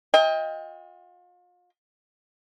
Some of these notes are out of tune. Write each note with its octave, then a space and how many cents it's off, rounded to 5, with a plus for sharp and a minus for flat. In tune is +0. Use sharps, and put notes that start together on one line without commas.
F4 +40 D#5 +30 G5 +30